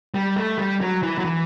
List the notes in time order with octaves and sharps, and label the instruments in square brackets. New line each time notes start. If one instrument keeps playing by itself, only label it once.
[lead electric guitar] G3
A3
G3
F#3
E3
F#3
E3